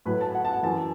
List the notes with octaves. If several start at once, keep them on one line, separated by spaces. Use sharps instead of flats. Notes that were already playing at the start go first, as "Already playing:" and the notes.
A2 F#3 B4
A5
F#5
A5
F#5
F#2 E3 A5